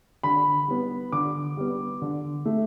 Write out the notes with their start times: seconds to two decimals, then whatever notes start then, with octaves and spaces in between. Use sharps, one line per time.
0.23 D3 B5
0.68 G3 B3
1.12 D3 D6
1.57 G3 B3
2.02 D3
2.45 A3